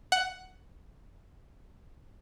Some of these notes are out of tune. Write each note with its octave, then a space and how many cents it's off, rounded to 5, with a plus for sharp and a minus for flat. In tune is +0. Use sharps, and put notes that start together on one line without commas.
F#5 +10